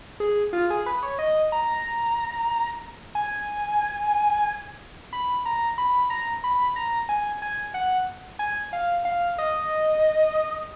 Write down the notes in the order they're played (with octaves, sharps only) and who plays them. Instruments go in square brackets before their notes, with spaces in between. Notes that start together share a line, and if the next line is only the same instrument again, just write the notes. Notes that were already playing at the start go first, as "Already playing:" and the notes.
[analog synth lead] G#4
F4
G#4
B4
C#5
D#5
A#5
G#5
B5
A#5
B5
A#5
B5
A#5
G#5
G#5
F#5
G#5
F5
F5
D#5